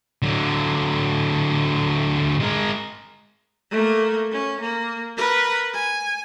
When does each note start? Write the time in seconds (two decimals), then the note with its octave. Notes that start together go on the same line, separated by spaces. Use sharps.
0.22 D3 F#3
2.40 G#3 A#4
3.71 A3 A#3
4.32 C#4
4.61 A#3
5.16 A#4 B4
5.73 G#5